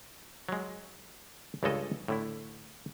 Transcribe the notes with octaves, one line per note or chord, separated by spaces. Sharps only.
F#3 G#3
C#2 G2 C#3 G#3 A4 D#5
A2 D3 E4